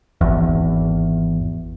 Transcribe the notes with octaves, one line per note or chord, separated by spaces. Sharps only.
G#1 E2